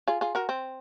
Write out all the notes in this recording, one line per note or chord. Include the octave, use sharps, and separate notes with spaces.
F4 G#4
F4 G#4
F#4 A#4
C4